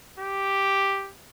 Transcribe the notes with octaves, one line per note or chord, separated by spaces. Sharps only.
G4